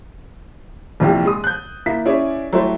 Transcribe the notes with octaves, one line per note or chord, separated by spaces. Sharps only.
A#1 F2 C3 E3 G4
G#3 D#6
F#6 G6
A#3 E4 B6
C#4 E4 G#4 C#5 D5
F#3 G3 A3 E4 C5